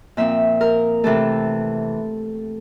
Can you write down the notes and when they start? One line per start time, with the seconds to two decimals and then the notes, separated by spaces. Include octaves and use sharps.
0.17 A#2 F3 C4 E5
0.61 A#4
1.04 C3 E3 A3 A4